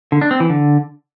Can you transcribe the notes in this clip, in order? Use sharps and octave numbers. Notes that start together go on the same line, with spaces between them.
D3
D4
C4
E3
D3